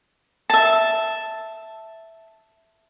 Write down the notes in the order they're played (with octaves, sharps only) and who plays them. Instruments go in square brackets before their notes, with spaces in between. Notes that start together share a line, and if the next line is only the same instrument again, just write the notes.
[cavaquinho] E5 A5